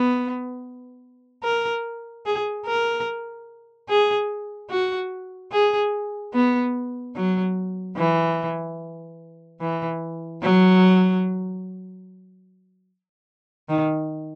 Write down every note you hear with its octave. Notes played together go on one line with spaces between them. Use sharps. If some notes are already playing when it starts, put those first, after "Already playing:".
Already playing: B3
A#4
G#4
A#4
G#4
F#4
G#4
B3
F#3
E3
E3
F#3
D#3